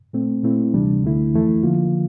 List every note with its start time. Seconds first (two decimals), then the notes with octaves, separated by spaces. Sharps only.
0.13 A#2 A3 C4
0.43 A#2 A3 C4 E4
0.73 D2 C3 E3 G3 D4
1.03 D2 D3 A3 E4
1.34 F2 E3 A3 E4
1.63 D3 F3 A#3 F4